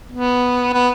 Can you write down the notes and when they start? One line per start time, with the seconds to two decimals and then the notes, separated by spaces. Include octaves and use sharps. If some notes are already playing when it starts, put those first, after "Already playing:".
0.12 B3
0.73 B3